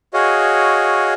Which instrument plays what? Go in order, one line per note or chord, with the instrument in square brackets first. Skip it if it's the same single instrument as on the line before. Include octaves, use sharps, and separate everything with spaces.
[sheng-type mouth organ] F#4 G#4 C#5 D#5 F5